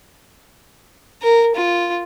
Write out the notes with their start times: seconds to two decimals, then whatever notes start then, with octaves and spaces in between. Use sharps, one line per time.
1.22 A#4
1.55 F4